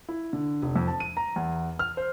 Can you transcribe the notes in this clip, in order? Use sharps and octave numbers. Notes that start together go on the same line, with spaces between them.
E4
D3
F1
F2
A5
D#7
A#5
E2
F6
C5